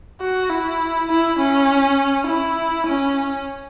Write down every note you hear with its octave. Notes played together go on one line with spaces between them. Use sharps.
F#4
E4
E4
C#4
E4
C#4